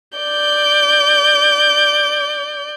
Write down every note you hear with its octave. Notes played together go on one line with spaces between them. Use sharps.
D5 G6